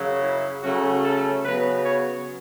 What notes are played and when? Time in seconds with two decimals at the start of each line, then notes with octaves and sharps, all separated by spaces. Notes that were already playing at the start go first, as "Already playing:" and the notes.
Already playing: F#2 C#3 F#3
0.22 E4
0.63 C#3 F#3 A3 C#4 F#4
1.04 A4
1.44 C#3 F#3 B3 B4
1.84 C#5